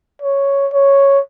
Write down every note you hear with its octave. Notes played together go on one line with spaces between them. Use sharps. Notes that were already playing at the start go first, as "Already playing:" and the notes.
C#5
C#5